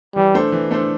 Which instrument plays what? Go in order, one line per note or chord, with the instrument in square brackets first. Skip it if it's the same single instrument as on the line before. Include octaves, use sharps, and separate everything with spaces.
[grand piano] E3 [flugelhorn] G3
[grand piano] A3 D4 A4 C5
E3
A3 D4 A4 C5